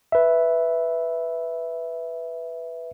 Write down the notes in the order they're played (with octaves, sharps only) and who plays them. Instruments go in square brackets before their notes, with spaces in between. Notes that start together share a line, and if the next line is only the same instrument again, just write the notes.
[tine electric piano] B4 E5